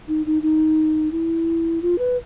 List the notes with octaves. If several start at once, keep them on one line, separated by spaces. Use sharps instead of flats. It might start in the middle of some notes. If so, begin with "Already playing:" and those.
D#4
D#4
D#4
E4
F4
B4